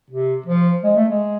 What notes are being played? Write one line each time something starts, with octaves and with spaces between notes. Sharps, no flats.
C3
F3
G#3
A3
G#3